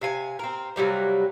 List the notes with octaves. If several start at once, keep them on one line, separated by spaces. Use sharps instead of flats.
C3 F5 G#5
C4 A#4
C3 F#3 G3 A#3